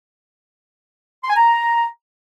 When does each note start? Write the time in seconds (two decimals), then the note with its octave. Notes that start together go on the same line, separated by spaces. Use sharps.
1.24 C6
1.30 G#5
1.36 A#5